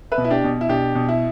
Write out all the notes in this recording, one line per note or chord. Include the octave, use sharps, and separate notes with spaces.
B4 E5
B2
E4
D4 G4
B2
E4
B2 D4 G4
B2
E4